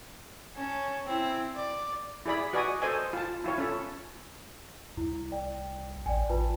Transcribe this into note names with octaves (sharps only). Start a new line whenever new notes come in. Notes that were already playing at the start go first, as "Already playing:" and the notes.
C#4 A5
C4 E4
D5
E4 G#4 D5 B5
F#4 B4 D5 D#5 G#5 D#6
A4 C5 D#5 G#5
F4 A5
E4 F4 C#5
C#4 A4
C2 E4
D5 G5
A1 D5 G5 G#5
A1 F4 B4 A5